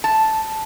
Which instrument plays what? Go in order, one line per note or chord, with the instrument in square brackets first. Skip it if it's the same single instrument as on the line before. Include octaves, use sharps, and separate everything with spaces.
[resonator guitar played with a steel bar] A5